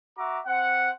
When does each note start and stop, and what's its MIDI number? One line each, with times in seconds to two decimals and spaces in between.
0.17 0.40 66
0.17 0.40 76
0.17 0.40 82
0.17 0.40 86
0.46 0.90 60
0.46 0.90 72
0.46 0.90 78